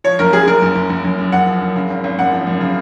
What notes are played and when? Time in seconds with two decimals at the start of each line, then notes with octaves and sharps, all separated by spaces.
0.04 F3 C#5
0.19 F#1 A#4
0.33 F#2 G#4
0.47 F#1 A#4
0.62 F#1
0.75 F#1
0.90 F#1
1.04 F#1
1.18 F#2
1.32 F#1 F#5
1.47 F3
1.62 F#1
1.76 C#3
1.90 G#1
2.04 G#1
2.18 F#2 F#5
2.32 F3
2.47 F#2
2.61 C#3